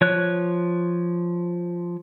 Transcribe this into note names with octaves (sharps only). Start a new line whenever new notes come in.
F3 C#5 F#6